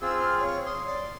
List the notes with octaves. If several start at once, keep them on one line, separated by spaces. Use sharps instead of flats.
C4 F4 G#4 E6
F6
C#5
C6 D#6
D5